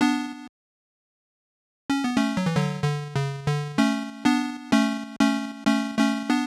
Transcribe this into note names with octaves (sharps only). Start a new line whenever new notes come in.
B3 D4
C#4
B3
A3 C#4
F#3
E3
D3 F#3
D3
C#3
D3
A3 C#4
B3 D4
A3 C#4
A3 C#4
A3 C#4
A3 C#4
B3 D4